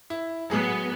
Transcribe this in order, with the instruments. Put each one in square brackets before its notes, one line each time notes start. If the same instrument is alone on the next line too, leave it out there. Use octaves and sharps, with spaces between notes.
[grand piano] E4
[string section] A2 B3 [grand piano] F#3 G#4